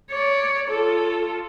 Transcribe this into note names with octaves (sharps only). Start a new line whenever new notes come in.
C#5 D5
F4 A4